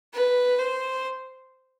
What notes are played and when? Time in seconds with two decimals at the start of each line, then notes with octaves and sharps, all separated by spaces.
0.14 B4
0.58 C5